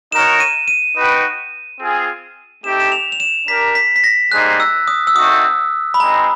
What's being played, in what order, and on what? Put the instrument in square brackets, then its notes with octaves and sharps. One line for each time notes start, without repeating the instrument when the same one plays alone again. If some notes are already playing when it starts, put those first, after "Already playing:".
[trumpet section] D#4 F#4 A#4 C#5 [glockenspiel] E7
[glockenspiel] D#7
D#7
[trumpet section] D#4 F#4 B4 D#5 G5
C4 F4 G#4
[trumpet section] A3 C4 D#4 G4 [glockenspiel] E7
[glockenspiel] E7
F7
F7
E7
[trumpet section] D4 G4 A#4 [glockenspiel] B6
[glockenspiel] B6
B6
A#6
[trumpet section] G3 A#3 D#4 G#4 C5 [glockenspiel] F#6
[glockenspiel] E6
D#6
E6
[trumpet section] A3 C4 D#4 F#4 [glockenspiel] D#6
[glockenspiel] B5
[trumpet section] G#3 C4 D#4 [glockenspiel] A#5